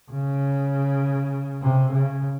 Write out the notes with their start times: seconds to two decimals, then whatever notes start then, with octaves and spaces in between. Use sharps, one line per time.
0.11 C#3
1.62 C3
1.92 C#3